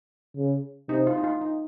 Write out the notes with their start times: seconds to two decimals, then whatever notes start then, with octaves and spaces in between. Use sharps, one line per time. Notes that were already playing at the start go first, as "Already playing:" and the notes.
0.37 C#3
0.89 C3 D#4
1.07 F4
1.17 D#4
1.24 F4
1.41 D#4